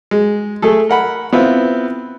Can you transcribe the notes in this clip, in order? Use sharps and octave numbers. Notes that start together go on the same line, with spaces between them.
G#3
A3 G#4 A4
A#4 F#5 B5
B3 C4 E4 F4